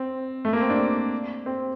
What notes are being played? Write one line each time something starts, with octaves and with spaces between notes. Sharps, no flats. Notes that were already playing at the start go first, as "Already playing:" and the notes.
Already playing: C4
A3
A#3
C4
D4
C4